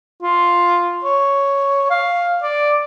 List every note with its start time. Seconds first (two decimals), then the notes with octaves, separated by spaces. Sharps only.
0.22 F4
1.04 C#5
1.90 F5
2.43 D5